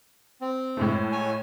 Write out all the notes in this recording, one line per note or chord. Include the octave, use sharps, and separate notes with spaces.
C4
A2 G#3 A3
C#5 G#5